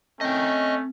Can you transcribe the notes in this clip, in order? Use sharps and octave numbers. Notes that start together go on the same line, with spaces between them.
A3 C4 C#4 D#5 G5